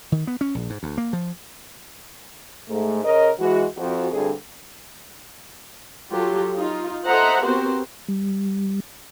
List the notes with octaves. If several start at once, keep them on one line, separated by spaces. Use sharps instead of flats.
D#3
B3
C#4
A#1
G#2
D2
A#3
F3
G#2 A3
C#3 A#4 C#5 D#5
E3 G#3 F#4
F2 F#4
D2 G2 D3 C4 G#4 A4
F#3 F4 G4 A4
D#4 F4
A4 C5 D#5 E5 F#5 A#5
B3 C4 F#4 G4 A#4 C5
G3